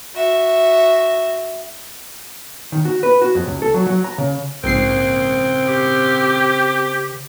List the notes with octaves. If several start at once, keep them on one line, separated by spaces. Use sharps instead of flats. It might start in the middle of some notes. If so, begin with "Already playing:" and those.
F#4 E5
D#3
F#4
B4
F#4
F2
C#2
A4
F#3
F#3
A#5
C#3
A#1 G#2 C#3 C4 A#4 C7
G4